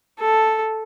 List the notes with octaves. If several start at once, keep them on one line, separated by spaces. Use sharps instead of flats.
A4